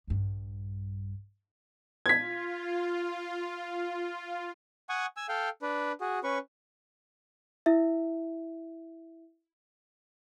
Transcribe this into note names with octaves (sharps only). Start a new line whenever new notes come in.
A#1 G2
F4 G#6 B6
F#5 G#5 C#6 D#6
G#5 E6
A4 F5 G5
D4 B4
F#4 G#4
C#4 B4 C#6
E4 E5